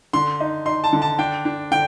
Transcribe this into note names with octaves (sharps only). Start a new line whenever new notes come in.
D3 C6
D#4
D#4 C6
A5
D3
A5
D4 G5
D4
D3 G5